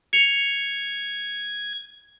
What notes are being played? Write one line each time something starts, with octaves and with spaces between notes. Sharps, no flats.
G#6 C#7 F7